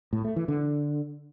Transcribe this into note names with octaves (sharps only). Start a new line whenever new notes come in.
A2
A3
E3
D3